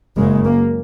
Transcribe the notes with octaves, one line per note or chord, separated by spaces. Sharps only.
F#1 F#2 C#3 G#3
A#3